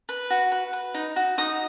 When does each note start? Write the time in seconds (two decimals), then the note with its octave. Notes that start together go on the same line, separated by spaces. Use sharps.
0.09 B4
0.30 F#4
0.52 B4
0.73 B4
0.94 D#4
1.16 F#4
1.38 D#4 D#6